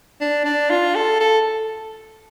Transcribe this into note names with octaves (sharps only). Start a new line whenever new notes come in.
D4
D4
F4
A4
A4